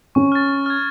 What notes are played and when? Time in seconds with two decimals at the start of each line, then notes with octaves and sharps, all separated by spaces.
0.15 C#4 C#6
0.32 F6 A6
0.49 C#6
0.66 F6 G#6